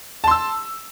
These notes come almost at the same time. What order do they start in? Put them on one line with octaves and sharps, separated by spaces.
A5 C6 E6